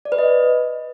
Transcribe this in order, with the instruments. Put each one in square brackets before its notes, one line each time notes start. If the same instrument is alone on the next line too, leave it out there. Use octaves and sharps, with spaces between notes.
[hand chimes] D5
B4
D#5